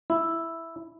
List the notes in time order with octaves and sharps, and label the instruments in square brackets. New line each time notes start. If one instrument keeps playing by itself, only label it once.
[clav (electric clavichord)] E4